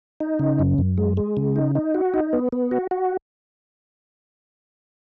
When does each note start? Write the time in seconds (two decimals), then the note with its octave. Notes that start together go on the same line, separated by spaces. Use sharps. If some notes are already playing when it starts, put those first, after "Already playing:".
0.20 D#4
0.39 C#3
0.59 F#2
0.78 F#2
0.98 G#3
1.17 G#3
1.37 C#3
1.56 D#4
1.75 D#4
1.94 F#4
2.14 D#4
2.33 B3
2.52 B3
2.71 F#4
2.91 F#4